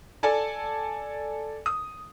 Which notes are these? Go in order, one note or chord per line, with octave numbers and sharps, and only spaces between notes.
A4 D5 G#5 A5
D#6